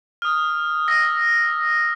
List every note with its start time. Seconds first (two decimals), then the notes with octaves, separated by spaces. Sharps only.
0.22 D#6 F6
0.88 E6 A#6